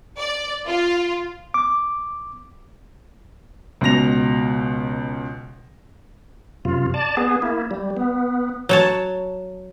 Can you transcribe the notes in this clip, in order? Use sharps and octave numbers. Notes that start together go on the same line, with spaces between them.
D5
F4
D6
C#2 B2 A#6 F7
F#2 C3 F4
D5 A5
B3 G#4
A#3 E4
G3
B3
F#3 C#5 A5